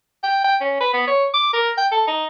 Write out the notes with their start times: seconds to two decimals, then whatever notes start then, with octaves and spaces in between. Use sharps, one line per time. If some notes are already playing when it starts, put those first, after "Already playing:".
0.24 G5
0.44 G5
0.61 C#4
0.80 B4
0.94 B3
1.08 C#5
1.34 D6
1.53 A#4
1.78 G5
1.92 A4
2.07 D#4